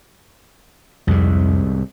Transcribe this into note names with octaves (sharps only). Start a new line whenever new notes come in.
C2 F2 G#2